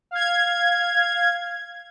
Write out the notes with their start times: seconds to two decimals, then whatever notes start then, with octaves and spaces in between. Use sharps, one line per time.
0.11 F5 G#6